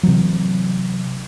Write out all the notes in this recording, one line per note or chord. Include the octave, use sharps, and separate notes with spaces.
C3 E3 F#3